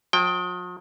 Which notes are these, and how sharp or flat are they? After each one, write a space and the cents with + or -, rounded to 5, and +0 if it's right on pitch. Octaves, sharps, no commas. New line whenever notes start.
F3 +45 G5 +0